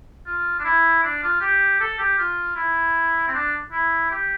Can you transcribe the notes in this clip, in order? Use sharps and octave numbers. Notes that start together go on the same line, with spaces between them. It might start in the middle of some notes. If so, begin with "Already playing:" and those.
F4
D4
E4
D4
F4
G4
A4
G4
F4
E4
C4
D4
E4
G4